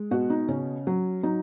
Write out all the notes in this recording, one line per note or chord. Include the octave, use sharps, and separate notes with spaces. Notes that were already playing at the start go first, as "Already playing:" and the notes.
Already playing: G#3
B2 F#4
D#4
C#3 C#4
F#3
F#3 D#4